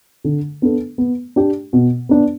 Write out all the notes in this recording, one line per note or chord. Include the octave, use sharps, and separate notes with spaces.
D3
B3 D4 A4
B3
D4 G4
B2
B3 D4